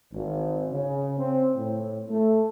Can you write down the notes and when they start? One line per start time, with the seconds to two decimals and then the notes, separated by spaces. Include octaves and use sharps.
0.12 G#1
0.71 C#3
1.18 C4
1.56 A2
2.09 A3